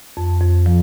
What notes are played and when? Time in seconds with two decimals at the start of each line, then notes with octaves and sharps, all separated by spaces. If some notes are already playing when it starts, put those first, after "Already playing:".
0.17 F2
0.41 F2
0.66 F3